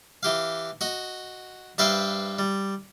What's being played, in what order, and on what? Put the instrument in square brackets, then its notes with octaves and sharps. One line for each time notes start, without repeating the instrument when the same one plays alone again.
[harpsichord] E3 G4 F5
F#4 D#5
G2 B4 C5 E5 F5 G5
G3